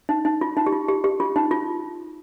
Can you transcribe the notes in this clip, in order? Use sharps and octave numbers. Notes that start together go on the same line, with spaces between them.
D#4
D#4
F4
D#4
G4
F4
G4
G4
F4
D#4
F4